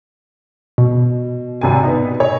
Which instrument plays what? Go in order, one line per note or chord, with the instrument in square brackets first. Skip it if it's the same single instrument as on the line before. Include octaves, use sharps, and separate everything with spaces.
[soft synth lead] B2
[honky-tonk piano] G#1 C3 G#5
B3 D#4
C#5 D#5